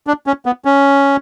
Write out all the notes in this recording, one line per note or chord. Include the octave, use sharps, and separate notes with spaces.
D4
C#4
B3
C#4